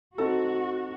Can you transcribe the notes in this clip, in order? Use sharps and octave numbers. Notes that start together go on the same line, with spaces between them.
C4 D#4 F#4 A4